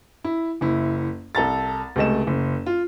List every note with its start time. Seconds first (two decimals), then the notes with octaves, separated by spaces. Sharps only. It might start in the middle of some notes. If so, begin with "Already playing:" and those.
0.24 E4
0.61 F#1 E4
1.35 C2 A4 A#5 A6
1.96 C#2 C3 A3 D#5 E7
2.27 F#1
2.66 F4